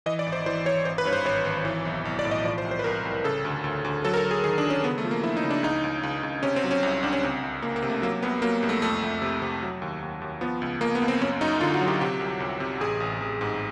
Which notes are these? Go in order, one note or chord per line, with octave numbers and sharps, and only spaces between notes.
E3 D#5
D5
G#1
C5
E3 C5
E3 C#5
G#1 C5
B4
G2 C#5
C5
G#1 C#5
G#1
E3
B1
B1
D5
A2
D#5
F3 D5
C5
C2
C5
B4
C2 A#4
C2
C#3 A4
D2
D2
D2
F#3 A4
A#4
A4
F#3
G#4
D#3 G#4
D4
F#3
C#4
C#3 B3
A3
F3
A#3
F3 E4
D#4
C#3
D4
C#2 D#4
C#2
C#2
C#2
C3 C#4
C4
F#3
C#4
C2
C2 D4
C#4
C#2 C4
C#2
C#2 A#3
A#3
C3
A3
F#3 A#3
C2 B3
F#3 A#3
C2
A3
F2 A3
F2
C3
C3
F#3
D#2
D#2
D#2
F3 B3
C#2
C#2 A#3
B3
C#2
C4
F#2 C#4
F#2 D#4
D3 F4
F#4
F#3
G4
C3 G4
C2
C2
C3
A1 G#4
A1
A1
G#2